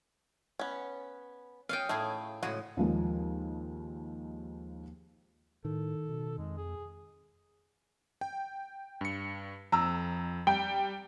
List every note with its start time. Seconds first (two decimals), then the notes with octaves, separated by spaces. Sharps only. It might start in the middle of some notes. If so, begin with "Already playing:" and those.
0.59 B3 C#4
1.69 C#4 F#4 D#5 F5 G5
1.89 A2 A3 E4 G#4
2.43 A2 C#3 G#3 F#4
2.77 D#2 F3 G#3
5.65 A2 D#3 A4
6.09 B2
6.38 F2 G#3
6.57 G#4
8.21 G5
9.01 G2 C#7
9.72 F2 A#5 E6
10.47 G3 G5